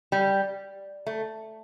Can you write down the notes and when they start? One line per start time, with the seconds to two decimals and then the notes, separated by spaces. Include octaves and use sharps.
0.12 G3
1.07 A3